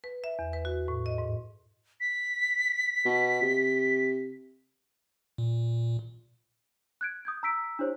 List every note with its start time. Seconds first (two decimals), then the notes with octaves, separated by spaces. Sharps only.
0.04 B4
0.24 E5
0.39 E2
0.53 B4
0.65 F#4
0.88 A2
1.06 D#5
1.18 G#2
2.00 B6
3.05 B2
3.42 C3
5.38 A#2
7.01 F#6 G#6 D7
7.25 D#6 G6 G#6
7.43 A#5 E6 B6 D7
7.79 D4 E4 G4 C5 C#5